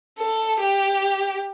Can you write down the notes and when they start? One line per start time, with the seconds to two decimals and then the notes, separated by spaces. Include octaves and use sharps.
0.19 A4
0.61 G4